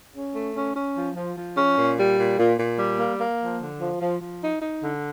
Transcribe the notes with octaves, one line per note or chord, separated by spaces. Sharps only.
C#4
A3
C#4
C#4
F3
F3
F3
C#4
A#2
G3
A#2
A#2
A#2
G3
A#3
A#3
F3
D3
F3
F3
F3
D#4
D#4
D3